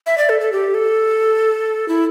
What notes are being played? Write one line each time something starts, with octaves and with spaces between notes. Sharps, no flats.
E5
D5
A4
A4
G4
A4
E4